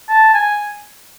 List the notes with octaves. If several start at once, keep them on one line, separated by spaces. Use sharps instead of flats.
A5
G#5